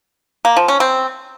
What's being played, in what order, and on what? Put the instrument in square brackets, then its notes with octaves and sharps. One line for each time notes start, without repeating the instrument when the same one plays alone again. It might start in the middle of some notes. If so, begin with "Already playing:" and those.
[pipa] A#3
F3
C#4
C4